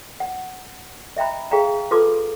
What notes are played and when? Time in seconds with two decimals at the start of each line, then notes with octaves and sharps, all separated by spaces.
0.20 F#5
1.17 D#5 E5 G5 A#5 B5
1.51 G#4 F5 G5 A#5
1.91 F4 A4 B4 A5 C6 D6